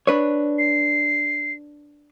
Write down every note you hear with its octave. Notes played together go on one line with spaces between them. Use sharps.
D4 B4 C#5
C7